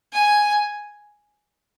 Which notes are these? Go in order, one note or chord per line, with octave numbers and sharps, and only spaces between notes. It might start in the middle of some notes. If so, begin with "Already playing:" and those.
G#5